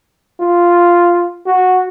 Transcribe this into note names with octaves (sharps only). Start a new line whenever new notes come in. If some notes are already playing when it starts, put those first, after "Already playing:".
F4
F#4